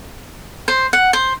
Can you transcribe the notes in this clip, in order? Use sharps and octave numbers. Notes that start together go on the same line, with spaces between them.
C5
F#5
C5